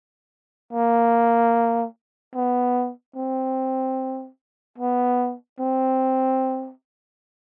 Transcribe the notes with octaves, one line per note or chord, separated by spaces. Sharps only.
A#3
B3
C4
B3
C4